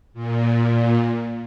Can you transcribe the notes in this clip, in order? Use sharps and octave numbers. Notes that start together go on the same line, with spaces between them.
A#2